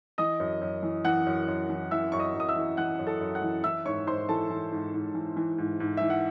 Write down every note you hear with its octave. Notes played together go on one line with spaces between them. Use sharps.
E3 D#5 D#6
F#2
F#2
E3
E3 F#5 F#6
F#2
F#2
E3
E3 E5 E6
F#2 C#6
D#5 D#6
F#2
D#6
E5 E6
E3
E3 F#5 F#6
F#2
A4 A5
F#2
F#5 F#6
E3
E3 E5 E6
G#2 C#5 C#6
G#2 C5 C6
E3 A4 A5
E3
G#2
G#2
E3
E3
G#2
G#2
E3 E5
F#5